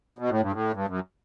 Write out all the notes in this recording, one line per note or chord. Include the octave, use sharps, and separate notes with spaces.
B2
A2
G2
A2
G2
F#2